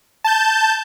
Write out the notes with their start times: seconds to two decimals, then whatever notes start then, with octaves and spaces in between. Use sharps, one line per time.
0.24 A5 G6